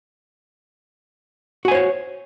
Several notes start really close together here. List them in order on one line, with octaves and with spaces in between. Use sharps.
F#4 G#5 C5 C#5